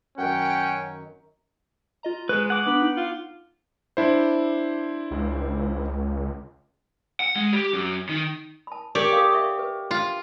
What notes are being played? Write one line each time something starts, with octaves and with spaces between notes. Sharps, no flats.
F#2 D#3 C#4 F#5 G5
F4 D#5 A#5
G#3 B4 C#6
F#5 D6
B3 D4 B4 F#7
D#4
F4
D4 E4 C5
C#2
F#5
G#3
G4
F#2
D#3
A5 B5
G4 A#4 C#5 D5
A4 F5
E5 C#6
B4
F4